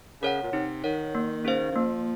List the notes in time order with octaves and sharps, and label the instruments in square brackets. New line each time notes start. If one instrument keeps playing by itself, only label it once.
[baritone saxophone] C#3 [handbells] A#4 C#5 F#5
[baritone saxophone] A#2
[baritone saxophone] C3 [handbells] D#4
[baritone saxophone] D#3 [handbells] A#4 C#5 F#5
[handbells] A#3
C#4 G#4 C5 F5
[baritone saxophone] D#3
[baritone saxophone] F3 [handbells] A#3